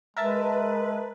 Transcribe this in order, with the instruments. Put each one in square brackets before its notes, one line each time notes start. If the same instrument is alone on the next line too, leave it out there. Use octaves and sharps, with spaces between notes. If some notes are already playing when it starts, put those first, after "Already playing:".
[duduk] G#3 [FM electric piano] A#4 E5 A5 [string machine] B4